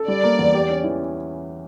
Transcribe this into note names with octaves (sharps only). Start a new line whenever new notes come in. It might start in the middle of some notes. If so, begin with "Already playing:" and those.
Already playing: A4
G3 D5
A#3
E2
G4
C#4
E3